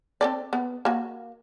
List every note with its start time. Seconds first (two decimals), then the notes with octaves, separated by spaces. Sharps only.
0.21 C4 A4 D5
0.53 B3
0.85 A#3 F#4